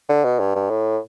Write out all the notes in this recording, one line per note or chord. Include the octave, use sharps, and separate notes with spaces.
D3
B2
G2
G2
A2